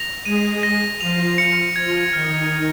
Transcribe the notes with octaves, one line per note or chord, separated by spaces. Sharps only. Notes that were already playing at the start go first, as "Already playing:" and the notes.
Already playing: A#6 F7
G#3 G#4 D#7
A#6
F3 F4 F7
C#7
F3 F4 G#6
D#3 D#4 F6
G#6